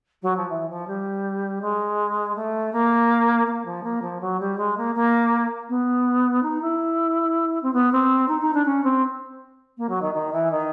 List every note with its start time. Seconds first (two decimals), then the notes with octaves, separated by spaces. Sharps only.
0.22 F#3
0.37 F3
0.49 E3
0.69 F3
0.87 G3
1.61 G#3
2.35 A3
2.72 A#3
3.47 A#3
3.65 F3
3.83 A#3
4.02 F3
4.21 F#3
4.39 G3
4.58 G#3
4.77 A#3
4.95 A#3
5.69 B3
6.43 D#4
6.61 E4
7.62 C4
7.73 B3
7.92 C4
8.28 D#4
8.41 D#4
8.54 D4
8.65 C#4
8.84 C4
9.77 A#3
9.89 F#3
10.01 D#3
10.14 D#3
10.32 E3
10.51 D#3